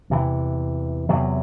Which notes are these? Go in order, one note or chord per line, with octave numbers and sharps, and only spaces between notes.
E2 C3 E3
E2 C3 F#3